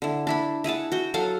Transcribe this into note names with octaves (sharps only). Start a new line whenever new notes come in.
D3 E4
D4 E4 B5
E4 G#4 F#5 A5
F#4 G5
F#3 A4 F5 F#5